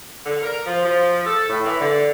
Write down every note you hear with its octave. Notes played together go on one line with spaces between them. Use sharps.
D3
A#4
F3
F3
A4
A2
E3
D3